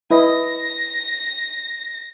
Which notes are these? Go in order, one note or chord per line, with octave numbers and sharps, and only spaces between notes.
E4 B4 D#5 A#6